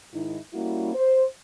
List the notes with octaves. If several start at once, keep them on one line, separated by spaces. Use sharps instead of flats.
G#2 D#3 D#4 E4
G3 A#3 C#4 E4 F#4
C5